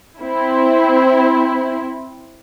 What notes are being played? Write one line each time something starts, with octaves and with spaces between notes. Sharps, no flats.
C4 E4